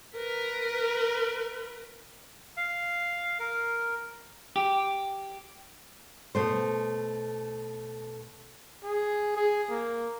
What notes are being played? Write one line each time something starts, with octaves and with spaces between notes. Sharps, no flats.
A#4 B4
F5
A#4
G4
B2 A3 C5
G#4
G#4
A#3